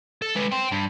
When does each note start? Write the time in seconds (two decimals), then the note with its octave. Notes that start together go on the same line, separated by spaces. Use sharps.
0.22 A4
0.36 G#3 B4
0.53 G5 C6
0.72 G2